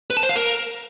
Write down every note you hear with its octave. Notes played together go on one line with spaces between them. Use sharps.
B4
A5
C5
F5
A#4